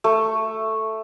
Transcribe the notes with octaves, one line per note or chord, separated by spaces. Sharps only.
A3